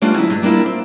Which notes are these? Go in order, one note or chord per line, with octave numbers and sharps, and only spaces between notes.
G3 A3 B3 C#4 D4 F4
D2 F#3 E4 D#5
G2
G3 A#3 D4 E4 F4
C4